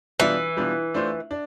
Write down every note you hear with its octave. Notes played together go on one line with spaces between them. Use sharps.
B2 E3 G3 D4 F4
B2 G3 D4 F4
A3 D4 F4 C5
D4